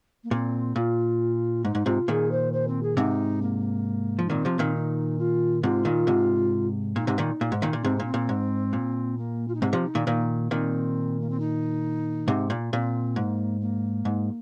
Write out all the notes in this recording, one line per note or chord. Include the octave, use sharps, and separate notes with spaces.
A#3
A#2 C4
A#2 F4
G#2 D#4
G#2
G#2 C3 F4
A#2 D#3 G#4
C5
C5
C4
G#4
G#2 C3 D#4
A#3
F3
D#4
A#2 D#3 C4
C3 F3
A#2 D#3
D#4
F4
G#2 C3 F4
A#2 D#3
G#2 C3
A#2 D#4
G#2 C3
A#2 D#3
A#2
G#2
A#2 D#3
A#2
G#2 C3 C4
A#2 D#4
C4
A#2
G#2
A#2
A#3
F4
D#4
G#2 C3 C4
C3 F3
D#4
A#2 D#3
A#2 D#3 A#3
A#2 D#3 C4
A#3
C4
D#4
G#2 C3
A#2
A#2 C4
G#2 A#3
A#3
G#2